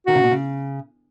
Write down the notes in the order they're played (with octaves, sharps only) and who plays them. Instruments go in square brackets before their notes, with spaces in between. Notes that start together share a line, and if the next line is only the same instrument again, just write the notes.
[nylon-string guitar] D#3 [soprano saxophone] F#4
[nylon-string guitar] C#3
B2
C#3